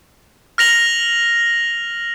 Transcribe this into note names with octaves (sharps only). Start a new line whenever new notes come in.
F6 A#6 F7 F#7